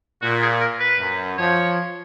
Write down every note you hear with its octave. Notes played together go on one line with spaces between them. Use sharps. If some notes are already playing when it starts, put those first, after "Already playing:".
A#2 F#4
G#4
A#4
B4
F#2
F3 C#5